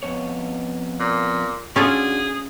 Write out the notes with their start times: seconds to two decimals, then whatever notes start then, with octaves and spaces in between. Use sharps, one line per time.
0.03 F2 B3 C#5
1.00 A#2
1.76 C#4 D4 F4 F#4 G#4 A4 D5